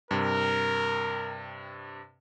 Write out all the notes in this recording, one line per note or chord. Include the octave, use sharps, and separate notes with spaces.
G2 C3 A#4